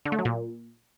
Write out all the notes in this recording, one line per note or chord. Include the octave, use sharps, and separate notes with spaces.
D3
A3
F#3
A#2